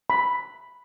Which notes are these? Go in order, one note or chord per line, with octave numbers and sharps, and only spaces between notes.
B5